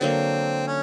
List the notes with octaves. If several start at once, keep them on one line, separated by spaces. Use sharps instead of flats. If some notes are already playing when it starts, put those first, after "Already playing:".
D3 F#3 A#3 C4
C#4